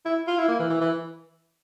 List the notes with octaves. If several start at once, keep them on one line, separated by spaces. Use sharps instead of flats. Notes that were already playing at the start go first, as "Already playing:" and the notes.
E4
F4
E4
A#3
E3
E3
E3